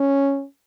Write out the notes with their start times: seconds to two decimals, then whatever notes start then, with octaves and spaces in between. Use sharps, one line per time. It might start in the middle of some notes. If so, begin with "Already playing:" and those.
Already playing: C#4